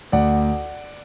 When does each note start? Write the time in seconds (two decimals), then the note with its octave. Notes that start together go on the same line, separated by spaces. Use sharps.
0.12 D2 D5 F#5